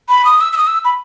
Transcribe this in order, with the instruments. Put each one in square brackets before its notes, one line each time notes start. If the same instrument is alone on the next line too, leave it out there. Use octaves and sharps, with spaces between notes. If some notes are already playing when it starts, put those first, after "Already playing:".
[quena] B5
D#6
E6
E6
D#6
E6
B5